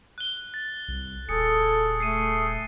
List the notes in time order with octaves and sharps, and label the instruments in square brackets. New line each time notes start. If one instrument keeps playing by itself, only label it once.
[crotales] F#6 G7
A6
[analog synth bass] C2
[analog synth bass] D#1 [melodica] G#4 [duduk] A4 [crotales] C#7
[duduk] A3 [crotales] C7 D#7